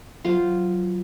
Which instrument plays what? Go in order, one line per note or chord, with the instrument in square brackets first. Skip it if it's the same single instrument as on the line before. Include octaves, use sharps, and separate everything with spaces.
[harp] F#3 [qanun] F4 C5